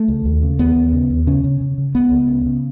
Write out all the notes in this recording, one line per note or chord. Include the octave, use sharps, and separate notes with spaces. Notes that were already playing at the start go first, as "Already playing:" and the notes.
Already playing: A3
C#2
D#2
C#3
D#2 B3
D#2
C#3
D#2
C#3 C#4
C#3
C#3
C#3
C#2 B3
C#2
C#3
C#3